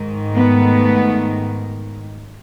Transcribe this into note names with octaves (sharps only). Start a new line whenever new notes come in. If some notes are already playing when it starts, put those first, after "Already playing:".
Already playing: G#2 D#3
A3 B3